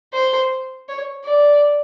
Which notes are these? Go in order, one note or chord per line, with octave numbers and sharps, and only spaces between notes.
C5
C#5
D5